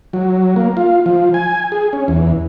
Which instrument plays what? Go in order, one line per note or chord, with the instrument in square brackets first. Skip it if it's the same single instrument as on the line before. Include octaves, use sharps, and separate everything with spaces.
[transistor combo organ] F#3
A#3
F4
F3
G#5
G#4
C#4
E2